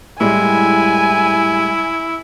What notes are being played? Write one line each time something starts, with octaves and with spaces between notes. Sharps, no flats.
A2 G3 G#3 E4 G#5